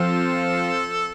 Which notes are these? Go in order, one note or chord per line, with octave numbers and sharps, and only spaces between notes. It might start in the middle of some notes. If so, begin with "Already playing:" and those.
Already playing: F3 C4 F4 A4 C5 F5